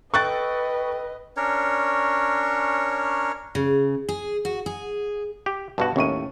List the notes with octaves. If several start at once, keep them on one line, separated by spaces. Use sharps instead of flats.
A4 B4 D#5 G5 C#6 F#6 A6
C#4 D4 A#4 C#5
C#3
G#4
F#4
G#4
G4
G2 B2 F#4 A5
D#2 A2 C#4 C#6 D#7